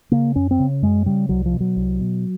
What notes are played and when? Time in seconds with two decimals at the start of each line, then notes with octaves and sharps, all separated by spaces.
0.11 C#3 A#3
0.36 F#2 C#4
0.51 C4
0.59 C#3
0.82 F#2 G#3
1.06 C#3 G3
1.29 C2 F#3
1.46 F3
1.53 B2
1.60 F#3
1.76 C2
2.00 B2